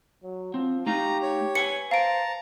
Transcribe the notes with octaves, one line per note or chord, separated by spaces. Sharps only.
F#3
F3 C4
A3 D#4 G4 F5 A#5
C#5
B4 F#5 G#5 C#7
C5 F5 A5 A#5 D7